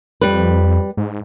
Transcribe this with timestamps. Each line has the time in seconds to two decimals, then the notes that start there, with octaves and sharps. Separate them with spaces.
0.21 F2 G3 B4
0.97 G#2